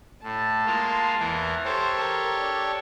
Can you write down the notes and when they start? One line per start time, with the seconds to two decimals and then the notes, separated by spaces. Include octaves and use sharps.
0.23 A2 A5
0.66 G#3 A#3 F4
1.20 E2 E3 A#4
1.65 G4 A4 C5 C#5
1.98 A#4
2.40 D4